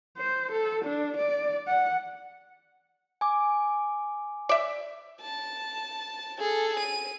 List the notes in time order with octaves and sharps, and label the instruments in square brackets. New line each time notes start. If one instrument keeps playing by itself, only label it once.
[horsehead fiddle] C5
A4
D4
D5
F#5
[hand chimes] G#5 D6
[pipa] D5 E5
[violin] A5
G#4 A4
D#7